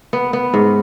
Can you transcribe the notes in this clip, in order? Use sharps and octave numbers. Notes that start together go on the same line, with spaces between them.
B3
B3
G#2